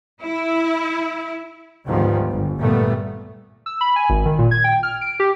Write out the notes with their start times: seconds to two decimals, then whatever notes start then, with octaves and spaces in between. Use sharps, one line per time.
0.21 E4
1.86 D2 G#2 D#3 F3 G3 B3
2.30 G1
2.60 A#2 D#3 G3 A3 B3
3.66 E6
3.81 B5
3.96 G#5
4.09 G#1
4.25 D#3
4.39 A#2
4.51 G#6
4.64 G5
4.83 F6
5.01 D7
5.20 G4